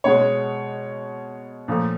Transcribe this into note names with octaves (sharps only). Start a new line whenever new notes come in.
B2 G#3 C#5
A#2 F3 A3